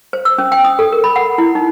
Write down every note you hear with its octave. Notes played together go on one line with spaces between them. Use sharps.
C5
E6
C#4
G5
D#6
A4
A#4
B5
F#5
E4
D#4